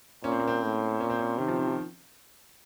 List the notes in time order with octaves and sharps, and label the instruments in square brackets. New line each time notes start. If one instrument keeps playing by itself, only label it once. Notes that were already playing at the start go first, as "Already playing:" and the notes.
[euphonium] A#2 [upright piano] C#4
[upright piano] C4
A#3
C4
[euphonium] A2
[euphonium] A#2 [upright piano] C#4
[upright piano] C4
C#4
[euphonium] C3 [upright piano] D#3
[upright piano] F3
D#3
F3